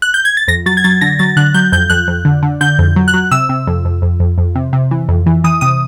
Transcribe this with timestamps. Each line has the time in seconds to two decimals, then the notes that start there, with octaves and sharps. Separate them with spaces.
0.02 F#6
0.14 G6
0.25 G#6
0.37 A6
0.48 F2 A#6
0.66 F#3 A6
0.77 G#6
0.84 F#3 A6
1.01 D3 A#6
1.19 F#3 A6
1.37 D3 F#6
1.54 F#3 G6
1.72 F2 G6
1.90 F2 F#6
2.08 F2
2.25 D3
2.43 D3
2.61 D3 G6
2.79 F2
2.96 F#3
3.08 F#6
3.14 F#3
3.31 C3 E6
3.49 C3
3.67 F2
3.85 F2
4.02 F2
4.20 F2
4.38 F2
4.55 C3
4.73 C3
4.91 E3
5.09 F2
5.26 E3
5.44 E3 D#6
5.61 C3 D#6